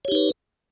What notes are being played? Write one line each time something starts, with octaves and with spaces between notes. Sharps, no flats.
D#4 G4 B4 C#5